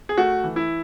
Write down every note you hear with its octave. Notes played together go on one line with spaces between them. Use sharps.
G#4
A3 F#4
E3
E4